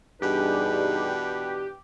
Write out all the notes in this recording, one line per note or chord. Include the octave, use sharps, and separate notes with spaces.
G2 B2 E3 D4 D#4 G4 G#4 B4